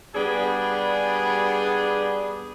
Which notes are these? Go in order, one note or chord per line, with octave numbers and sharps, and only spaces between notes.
G3 B3 D4 G#4